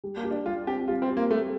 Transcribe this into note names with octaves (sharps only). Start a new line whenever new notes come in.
G3
A#3
G4
D4
G3 F4
C4 G4
G3 F4
C4
G4
A#3
G3 A3